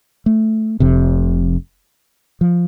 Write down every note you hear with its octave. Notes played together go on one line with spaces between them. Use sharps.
A3
F1 F2 C3
F3